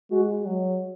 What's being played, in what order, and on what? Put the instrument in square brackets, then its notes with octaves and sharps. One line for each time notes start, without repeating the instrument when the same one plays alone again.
[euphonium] G#3 [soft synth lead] F#4
[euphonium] F#3